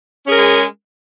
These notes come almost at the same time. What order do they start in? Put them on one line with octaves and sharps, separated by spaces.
C#4 G#4 A#4 G#3